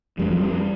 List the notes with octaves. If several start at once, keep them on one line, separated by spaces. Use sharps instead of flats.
F2 G3
F3
G3